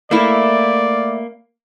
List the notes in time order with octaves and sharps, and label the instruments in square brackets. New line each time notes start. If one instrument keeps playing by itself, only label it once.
[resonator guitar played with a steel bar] A3 E4 [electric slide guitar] A#3 [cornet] D5